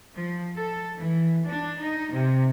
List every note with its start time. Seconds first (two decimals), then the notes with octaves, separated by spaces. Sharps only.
0.15 F3
0.55 A4
0.96 E3
1.46 D4
1.81 D#4
2.12 C3